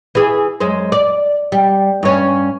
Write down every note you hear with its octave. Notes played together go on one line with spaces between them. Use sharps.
E3 G#4
F#2 G#3 C5
D5
G3
G2 C#4